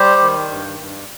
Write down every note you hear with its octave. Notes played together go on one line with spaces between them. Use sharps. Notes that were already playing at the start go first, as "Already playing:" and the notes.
Already playing: G3 G4 C5
D#3
G2
G2